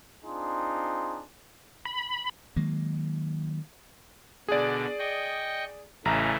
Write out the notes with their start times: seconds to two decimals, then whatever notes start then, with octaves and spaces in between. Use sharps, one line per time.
0.25 C4 D4 D#4 F4 G#4 C6
1.85 B5
2.56 D#3 F#3 G#3 A#3
4.48 B2 D3 G#4 D5
4.99 D#5 G5 C#6
6.05 A1 C#3 E3 A3 A#5